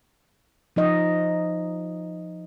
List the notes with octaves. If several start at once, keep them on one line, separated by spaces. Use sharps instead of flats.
F3 D#4 D#5